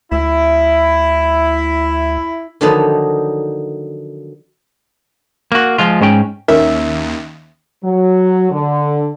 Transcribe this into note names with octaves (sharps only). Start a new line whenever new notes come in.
D2 E4
D3 D#3 F3 F#3 B3 D#4
A#3 F#4
F3 G#3 F4
G#2 G#3 C#4 G5
D#2 D#3 C#4 A#4 E5
F#3
D3